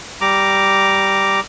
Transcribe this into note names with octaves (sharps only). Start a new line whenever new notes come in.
G3 A#5 D6